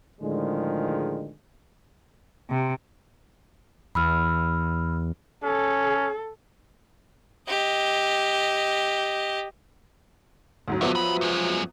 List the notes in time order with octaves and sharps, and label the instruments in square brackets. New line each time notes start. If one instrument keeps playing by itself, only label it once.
[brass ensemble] A2 D3 D#3 F3 G#3
[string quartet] C3
[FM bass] E2 [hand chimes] B5 E6 F6
[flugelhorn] C#4 [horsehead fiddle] A4
[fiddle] G4 D#5
[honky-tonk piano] D2 G#2 F#3
[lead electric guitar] A2 D3 [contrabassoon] F3 [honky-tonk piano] F#3 B3 E5
[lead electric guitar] G2 B5
F#2 G#3